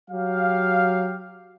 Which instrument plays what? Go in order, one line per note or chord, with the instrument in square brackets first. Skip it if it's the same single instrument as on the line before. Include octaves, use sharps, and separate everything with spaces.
[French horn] F#3 [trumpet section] G4 F5